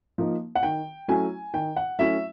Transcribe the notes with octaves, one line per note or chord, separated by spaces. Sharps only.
F3 A#3 D#4
F#5
D#3 G5
F#3 A3 C#4 E4 G#5
D#3 G5
F#5
F#3 A3 C#4 E4 E5